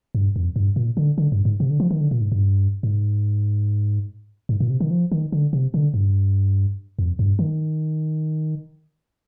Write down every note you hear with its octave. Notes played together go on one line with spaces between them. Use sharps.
G2
F2
G2
A#2
D3
D3
G2
G#2
C3
D3
F3
D#3
D3
A#2
G#2
G2
G#2
G#2
A#2
C3
D#3
F3
D#3
D3
C3
D3
G2
F2
G2
D#3